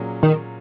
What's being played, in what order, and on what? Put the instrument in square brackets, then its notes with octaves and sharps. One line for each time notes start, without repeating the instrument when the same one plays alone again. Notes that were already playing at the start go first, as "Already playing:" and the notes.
Already playing: [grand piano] A#2 F#3 A#3 C#4 G#4
[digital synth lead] D#3